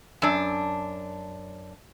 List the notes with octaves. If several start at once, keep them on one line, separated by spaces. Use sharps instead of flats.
F#2 D4